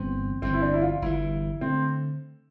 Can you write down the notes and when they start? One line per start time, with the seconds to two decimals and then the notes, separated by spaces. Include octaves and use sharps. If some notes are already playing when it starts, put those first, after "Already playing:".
Already playing: G1 G2 E3 B3 C4
0.42 G1 G2 E3 C4
0.54 E4
0.62 D4
0.74 E4
0.82 F4
1.02 G1 G2 E3 E4
1.61 D3 A3 C4